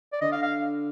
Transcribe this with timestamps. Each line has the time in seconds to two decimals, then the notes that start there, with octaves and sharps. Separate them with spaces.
0.13 D5
0.21 D3 D#5
0.32 F5
0.43 F5